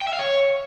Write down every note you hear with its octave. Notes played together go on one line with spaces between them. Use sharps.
G5
E5
F5
C#5